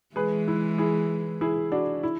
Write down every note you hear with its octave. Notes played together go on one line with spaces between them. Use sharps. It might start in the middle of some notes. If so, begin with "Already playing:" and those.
E3 G#3 G#4 B4
E4
E4 G#4
E4 G#4
D4 F#4
E4